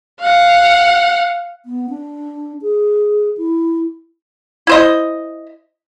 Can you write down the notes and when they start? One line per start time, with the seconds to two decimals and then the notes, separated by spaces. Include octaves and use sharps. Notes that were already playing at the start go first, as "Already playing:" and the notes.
0.20 F5 F#5
1.65 B3
1.89 D4
2.62 G#4
3.37 E4
4.67 E4 C5 D#5